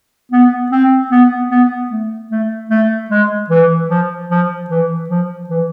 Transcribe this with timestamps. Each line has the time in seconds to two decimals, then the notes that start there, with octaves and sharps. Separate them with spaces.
0.32 B3
0.72 C4
1.11 B3
1.50 B3
1.91 A3
2.31 A3
2.70 A3
3.10 G#3
3.50 E3
3.90 F3
4.30 F3
4.70 E3
5.09 F3
5.49 E3